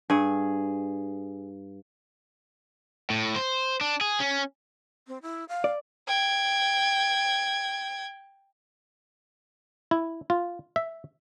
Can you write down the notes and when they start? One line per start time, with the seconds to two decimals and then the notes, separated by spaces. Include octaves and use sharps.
0.10 G2 G#4
3.10 A2
3.36 C5
3.81 D4
4.01 G#4
4.20 C#4
5.07 C4
5.22 E4
5.49 F5
5.64 D5
6.08 G5 G#6
9.91 E4
10.30 F4
10.76 E5